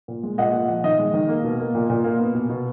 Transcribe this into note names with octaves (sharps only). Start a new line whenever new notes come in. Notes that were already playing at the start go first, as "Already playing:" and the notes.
A#2
G#3
A#2 D#5 F#5
A#2
F3
D#3 D#5
G#3
D#3
A#3
B2
A#3
A#2
A#2
A#3
B3
B2
B2